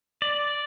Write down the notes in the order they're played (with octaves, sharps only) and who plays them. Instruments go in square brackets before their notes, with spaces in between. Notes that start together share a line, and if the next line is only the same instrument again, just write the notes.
[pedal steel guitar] D5